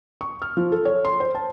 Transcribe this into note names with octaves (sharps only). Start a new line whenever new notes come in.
C#6
F6
F3
A4
C#5
C6
C5
A5